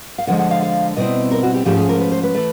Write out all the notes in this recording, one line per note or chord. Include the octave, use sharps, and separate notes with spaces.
F5
D3 F3 G#3 F#5
F#5
F5
F5
B2 G3 C4 E4 D#5
A#4
F#4
G4
G#2 F3 A3 C#4 G4
G#4
A#4
B4
C5
B4
E3 A3